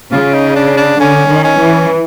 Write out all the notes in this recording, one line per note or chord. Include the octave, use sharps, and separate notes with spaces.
C#3 F4
D#4
D4
D4
D3 C#4
D#3
C#4
E3